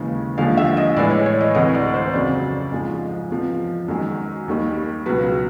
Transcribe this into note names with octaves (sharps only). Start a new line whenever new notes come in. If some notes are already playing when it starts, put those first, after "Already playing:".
Already playing: D#2 C#3 E3 G#3
D#2 D3 F3 G#3 F5
E5
D#5
A2 E3 G#3 D5
C#5
C#5
D#5
D2 C3 E3 D#5
D5
C5
F2 C#3 F#3 D5
G#2 F3 G#3
E2 C3 F3
F#2 D#3 G#3
D#2 D#3 G3
C#2 B2 F#3 B4